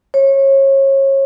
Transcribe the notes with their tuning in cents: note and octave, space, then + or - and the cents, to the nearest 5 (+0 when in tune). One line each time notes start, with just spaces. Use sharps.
C#5 -30